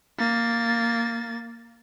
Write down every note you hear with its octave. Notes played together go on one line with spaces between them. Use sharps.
A#3 A6